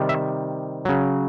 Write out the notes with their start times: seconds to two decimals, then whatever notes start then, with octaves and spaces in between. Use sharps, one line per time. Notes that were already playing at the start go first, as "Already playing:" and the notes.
Already playing: C3 D#3 G3
0.09 E5
0.85 C#3 F#3